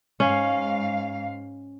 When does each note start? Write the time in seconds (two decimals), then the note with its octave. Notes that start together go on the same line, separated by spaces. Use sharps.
0.20 G#2 C#4 F5